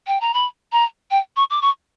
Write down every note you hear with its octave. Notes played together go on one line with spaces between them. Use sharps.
G5
A#5
B5
A#5
G5
C#6
D6
C#6